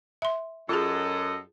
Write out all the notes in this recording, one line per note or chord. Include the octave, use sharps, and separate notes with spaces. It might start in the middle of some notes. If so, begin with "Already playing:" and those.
E5 C6
F#2 F4 G#4 A4 D#5